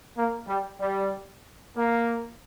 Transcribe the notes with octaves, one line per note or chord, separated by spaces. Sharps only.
A#3
G3
G3
A#3